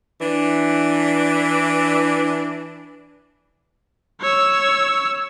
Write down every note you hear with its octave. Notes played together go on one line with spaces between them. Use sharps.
E3 D4
C#5 E6